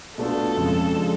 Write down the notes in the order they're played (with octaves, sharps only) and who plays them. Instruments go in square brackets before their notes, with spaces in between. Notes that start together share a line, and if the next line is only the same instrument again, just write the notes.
[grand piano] B2 A3 D4 F4 [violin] A4
[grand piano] F2 C#3 G#3
F3 G#3 D4